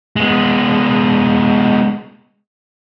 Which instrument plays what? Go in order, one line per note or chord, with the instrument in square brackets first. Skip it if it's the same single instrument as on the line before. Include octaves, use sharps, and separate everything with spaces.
[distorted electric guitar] G#3 B3